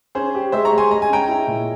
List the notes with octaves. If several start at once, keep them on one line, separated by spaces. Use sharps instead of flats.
C#4 G#4 C5
G4
G#3 C5 E5
A#5 C#6
G#3
G#5 C6
G#3 A#5
G#5
C#4 G5 A#5
E4
A#2